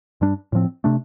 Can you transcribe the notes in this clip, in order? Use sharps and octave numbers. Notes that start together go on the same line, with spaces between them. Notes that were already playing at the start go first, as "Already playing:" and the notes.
G2 G3 D4
A2 F3 C4
C3 A3 D4